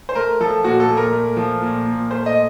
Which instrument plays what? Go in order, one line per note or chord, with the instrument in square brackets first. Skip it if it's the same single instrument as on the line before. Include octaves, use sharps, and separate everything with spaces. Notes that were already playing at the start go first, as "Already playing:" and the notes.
[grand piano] C5
A3 A#4
F3 A4
A#2 F#4
A4
A#2
A#4
A3
F3
A#2
A#2
A3 C5
D#5